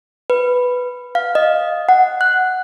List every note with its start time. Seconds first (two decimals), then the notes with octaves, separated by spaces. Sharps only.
0.30 B4
1.15 F5
1.35 D#5
1.89 F#5
2.21 F#6